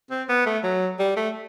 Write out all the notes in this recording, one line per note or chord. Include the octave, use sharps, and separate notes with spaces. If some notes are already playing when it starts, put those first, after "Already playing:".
C4
B3
A3
F#3
G3
A3